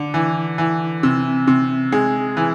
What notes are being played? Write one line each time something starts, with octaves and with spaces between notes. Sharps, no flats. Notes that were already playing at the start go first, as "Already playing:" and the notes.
Already playing: D3
E3
E3
C3
C3
G#3
E3